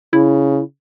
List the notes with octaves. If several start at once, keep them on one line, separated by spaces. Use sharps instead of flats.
C#3 E4